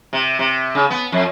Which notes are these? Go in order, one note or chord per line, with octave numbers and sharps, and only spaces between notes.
C3
C3
C#3
B3
F2